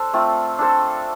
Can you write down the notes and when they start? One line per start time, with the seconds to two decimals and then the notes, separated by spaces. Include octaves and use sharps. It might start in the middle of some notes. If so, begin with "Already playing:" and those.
Already playing: D4 A4 C5
0.13 A3 C4 F4
0.59 D4 A4 C5